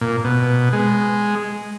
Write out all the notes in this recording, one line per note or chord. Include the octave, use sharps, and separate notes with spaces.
A#2
B2
G#3